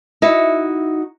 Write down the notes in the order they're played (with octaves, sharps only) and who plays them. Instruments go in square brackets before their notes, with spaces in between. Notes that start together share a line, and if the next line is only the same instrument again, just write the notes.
[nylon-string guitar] D#4 E4 F#4 E5